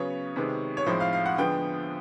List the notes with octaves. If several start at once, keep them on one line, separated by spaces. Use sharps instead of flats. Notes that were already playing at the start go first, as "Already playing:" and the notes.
Already playing: C#3 F#3 B3 C#5
C3 D#3 G#3 B3
C#5
A2 F3 G#3 C4 D#4 C5
F5
F5
F#5
D3 F3 G#3 B3 G5